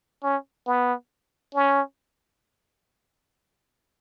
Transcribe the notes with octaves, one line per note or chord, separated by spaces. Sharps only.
C#4
B3
C#4